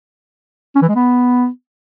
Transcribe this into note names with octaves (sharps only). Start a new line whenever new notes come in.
C#4
E3
G#3
B3